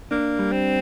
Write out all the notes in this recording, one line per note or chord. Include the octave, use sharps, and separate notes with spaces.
A#3 D4
G3
C4